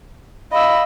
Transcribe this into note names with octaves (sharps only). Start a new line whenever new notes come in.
D#5 F5 B5 E6